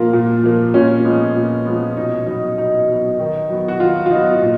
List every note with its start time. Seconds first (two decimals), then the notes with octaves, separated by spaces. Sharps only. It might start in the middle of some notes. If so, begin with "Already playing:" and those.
Already playing: A#2 F3 A#3 F4
0.13 A#2
0.43 F3 A#3
0.74 A#2 C#4
1.05 F3 G#3 B3
1.36 A#2
1.66 F3 G#3 B3
1.97 B2 D#4
2.27 F#3 B3 D#4
2.58 B2 D#4
2.88 F#3 B3
3.20 D#3
3.50 F#3 B3
3.68 F#4
3.80 D#3 F4
4.06 F4
4.11 F#3 B3 D#4
4.42 A#2